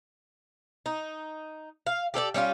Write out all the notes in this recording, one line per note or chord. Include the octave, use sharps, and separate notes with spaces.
D#4
F5
G4 A4 C#5 D5
G3 C#4 D#4 F4